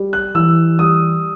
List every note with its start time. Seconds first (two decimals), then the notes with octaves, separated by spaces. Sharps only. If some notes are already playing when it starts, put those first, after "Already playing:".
Already playing: G3
0.13 F#6
0.35 E3 E6
0.79 G3 D#6